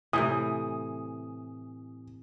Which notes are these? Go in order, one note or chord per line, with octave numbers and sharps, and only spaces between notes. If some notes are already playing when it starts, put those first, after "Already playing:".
A2 C3 E3 G#5 D#6